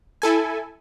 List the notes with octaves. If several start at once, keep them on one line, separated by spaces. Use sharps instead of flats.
E4 A4 G#5